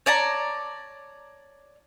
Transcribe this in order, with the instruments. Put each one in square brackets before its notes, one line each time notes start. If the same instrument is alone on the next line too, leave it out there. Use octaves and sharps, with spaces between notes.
[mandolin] C#5 D5 A5 A#5